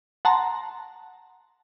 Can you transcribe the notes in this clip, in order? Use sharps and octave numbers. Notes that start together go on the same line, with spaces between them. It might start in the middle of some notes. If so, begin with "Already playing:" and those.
F#5 A5 A#5 C6